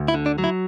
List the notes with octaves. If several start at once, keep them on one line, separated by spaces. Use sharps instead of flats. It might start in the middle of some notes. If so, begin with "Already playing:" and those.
Already playing: D2
E4
D3
D4
F#3
E4